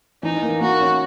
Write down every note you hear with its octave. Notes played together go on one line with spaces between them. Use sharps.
E3 D#4
A#3
A#3 F#4
C#4